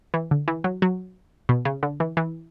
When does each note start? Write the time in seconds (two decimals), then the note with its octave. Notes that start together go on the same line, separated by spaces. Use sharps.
0.14 E3
0.31 D3
0.48 E3
0.64 F#3
0.82 F#3
1.49 B2
1.65 C#3
1.83 D3
2.00 E3
2.17 E3